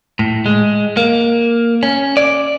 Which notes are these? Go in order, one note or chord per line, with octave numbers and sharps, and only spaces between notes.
A2
G#3
A#3
C#4
D5